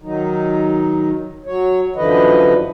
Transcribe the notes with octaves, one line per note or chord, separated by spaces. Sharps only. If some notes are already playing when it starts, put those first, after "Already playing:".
D#3 F#3 D#4
F#3 C#5
F#2 D3 E3 F3 B4 D#5